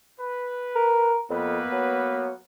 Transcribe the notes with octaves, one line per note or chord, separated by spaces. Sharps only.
B4
A#4
F2 A#3 B3 B4
F#3